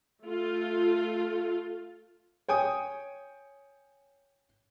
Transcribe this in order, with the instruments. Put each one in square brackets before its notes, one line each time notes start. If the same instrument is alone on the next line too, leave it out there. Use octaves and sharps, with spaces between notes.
[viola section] A3 F4 A4
[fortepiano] C#5 G5 G#5 D#6